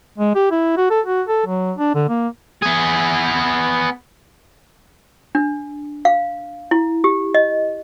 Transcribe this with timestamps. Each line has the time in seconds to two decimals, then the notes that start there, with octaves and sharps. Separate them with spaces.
0.18 G#3
0.35 G4
0.51 E4
0.77 F#4
0.90 A4
1.06 F#4
1.28 A4
1.46 F#3
1.78 D4
1.94 D3
2.09 A#3
2.62 B3 G#4
5.35 D4
6.05 F5
6.71 E4
7.04 G4
7.34 D#5